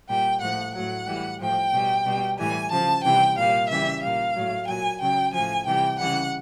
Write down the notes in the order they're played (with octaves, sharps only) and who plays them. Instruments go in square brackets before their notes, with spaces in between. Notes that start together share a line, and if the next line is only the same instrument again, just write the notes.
[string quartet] A#2 G3 G5
A2 F3 F#5
A2 F#3 F#5
A2 E3 G3
A2 F3 G5
B2 G3
B2 G3
A2 E3 G3 G#5
C#3 F3 A5
C3 E3 G3 G5
A#2 G3 F5
C#3 E3 G3 E5
A#2 G3 F5
A2 F#3
A#2 F#3 G#5
C#3 F#3 G5
A2 F3 G#5
C3 E3 G3 G5
C#3 E3 G3 F#5